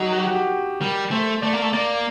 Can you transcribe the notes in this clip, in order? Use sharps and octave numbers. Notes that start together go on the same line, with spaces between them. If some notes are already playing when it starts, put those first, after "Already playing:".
Already playing: F#3 D#4 F#4
F#4
G4
F#4
G4
G3 A#4
A3 C5
A3 D5
A#3
A3
A#3 D5